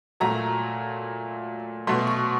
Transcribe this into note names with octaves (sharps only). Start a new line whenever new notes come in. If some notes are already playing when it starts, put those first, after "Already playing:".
A#2 F#3 A3 A#5
B2 F#3 A3 C6
C#6